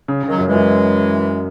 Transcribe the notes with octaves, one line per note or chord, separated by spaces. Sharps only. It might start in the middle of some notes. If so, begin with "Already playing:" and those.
C#3
C#3
D#3 F#3
F#2
E3 G#3
F#2